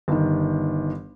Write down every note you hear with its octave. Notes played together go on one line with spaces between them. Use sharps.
G1 D#3